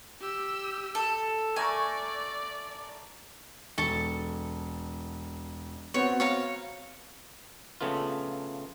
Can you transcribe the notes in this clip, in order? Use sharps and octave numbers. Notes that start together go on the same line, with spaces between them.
G4 E6
A4
A3 A#4 D5 G#5 C#6
E1 A4 C#6
B3 C4 F#4 C#5
C#5 F5 A#5
A#1 C#3 A3 B3 F4